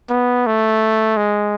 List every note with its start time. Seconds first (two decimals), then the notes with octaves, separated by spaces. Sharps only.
0.10 B3
0.47 A3
1.17 G#3